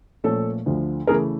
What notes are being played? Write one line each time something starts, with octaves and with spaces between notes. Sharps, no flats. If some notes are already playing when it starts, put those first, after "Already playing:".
A#2 F3 A3 C#4 A4
D2 D3 F3
C#3 E3 A3 G#4 A#4